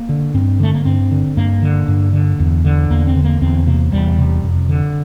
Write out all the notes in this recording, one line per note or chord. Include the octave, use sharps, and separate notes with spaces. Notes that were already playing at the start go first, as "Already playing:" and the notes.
Already playing: A#3
D3
G2 C4
D3 A3
A#3
G2 C4
D3
G2 A#3
D3
G2
D3
E2
D3
E2 A#3
C4
D3
A#3
E2 C4
C3 A#3
E2 G3
C3
F2
D3